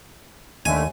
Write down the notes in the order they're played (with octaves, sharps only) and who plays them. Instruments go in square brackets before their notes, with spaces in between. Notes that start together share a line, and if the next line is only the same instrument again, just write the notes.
[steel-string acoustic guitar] D#2 [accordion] D3 A3 [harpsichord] G#5